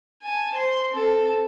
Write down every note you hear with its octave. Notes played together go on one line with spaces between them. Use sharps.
G#5 A5
C5 C6
C4 A4